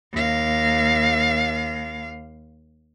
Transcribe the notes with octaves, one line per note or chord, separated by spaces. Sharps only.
D#2 F5